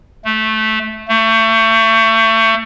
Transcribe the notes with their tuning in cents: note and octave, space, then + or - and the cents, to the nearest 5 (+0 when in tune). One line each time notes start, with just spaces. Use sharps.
A3 -10
A3 +30